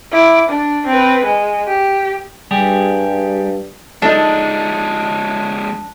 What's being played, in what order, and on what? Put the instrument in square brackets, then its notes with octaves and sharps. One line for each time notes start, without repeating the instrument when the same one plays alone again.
[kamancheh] E4 D6
D4
C4 B4
G#3
G4
[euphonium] G2 [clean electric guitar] G3 G4 G#4
[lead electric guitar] F3 G#3 [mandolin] D4 [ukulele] D#4 A4